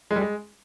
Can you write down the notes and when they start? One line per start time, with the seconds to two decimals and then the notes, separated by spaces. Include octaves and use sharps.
0.11 G#3
0.16 G3
0.21 G#3